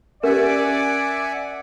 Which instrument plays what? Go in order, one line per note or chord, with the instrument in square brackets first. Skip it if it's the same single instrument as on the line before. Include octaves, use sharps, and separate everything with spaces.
[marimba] C#4 G4 [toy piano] A#4 [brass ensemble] D5 [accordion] E5 F#5 G#5